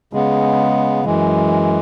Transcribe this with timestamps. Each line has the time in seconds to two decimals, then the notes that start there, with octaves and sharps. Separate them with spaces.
0.13 C#3 G#3 B3
1.04 F#2 E3 G#3